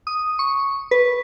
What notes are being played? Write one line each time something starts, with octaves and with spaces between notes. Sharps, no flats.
D#6
C#6
B4